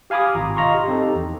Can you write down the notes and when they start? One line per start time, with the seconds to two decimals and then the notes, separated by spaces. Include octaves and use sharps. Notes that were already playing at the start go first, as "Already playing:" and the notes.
0.10 G4 F5 G#5 B5 D6 D#6
0.35 G#1 B2 F4 A#5
0.57 D#5 F5 A#5 C6 C#6
0.74 G4
0.88 C4 D#4 G4 A4
1.15 E2